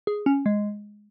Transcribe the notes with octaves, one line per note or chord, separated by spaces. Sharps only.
G#4
C#4
G#3